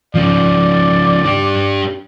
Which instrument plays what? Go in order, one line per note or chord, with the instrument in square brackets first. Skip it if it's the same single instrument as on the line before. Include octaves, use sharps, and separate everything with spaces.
[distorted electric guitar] C#3 F3 [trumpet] D5
[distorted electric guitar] D4 G4